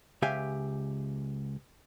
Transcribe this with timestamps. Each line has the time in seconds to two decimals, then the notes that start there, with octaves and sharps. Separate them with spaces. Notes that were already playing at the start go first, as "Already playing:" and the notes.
0.22 C#2 G4 E5 F5 G#5